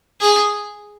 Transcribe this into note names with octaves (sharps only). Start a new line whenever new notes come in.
G#4